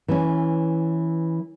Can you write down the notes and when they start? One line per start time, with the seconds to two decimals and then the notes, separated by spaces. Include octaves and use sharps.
0.08 E3 C#4